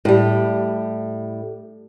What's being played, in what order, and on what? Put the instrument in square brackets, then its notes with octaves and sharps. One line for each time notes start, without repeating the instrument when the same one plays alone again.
[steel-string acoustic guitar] A2 G3